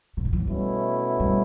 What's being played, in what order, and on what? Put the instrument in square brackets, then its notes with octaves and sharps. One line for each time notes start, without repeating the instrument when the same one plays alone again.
[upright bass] C#3
D3
E3
F#3
[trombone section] B2 A3 C#4 E4 [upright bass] G3
[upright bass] G3